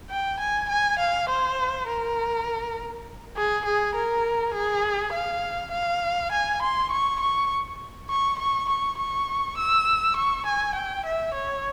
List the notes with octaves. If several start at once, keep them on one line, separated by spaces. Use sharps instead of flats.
G5
G#5
G#5
F5
C5
A#4
G#4
G#4
A#4
G#4
F5
F5
G#5
C6
C#6
C#6
C#6
C#6
C#6
C#6
E6
C#6
G#5
G5
E5
C#5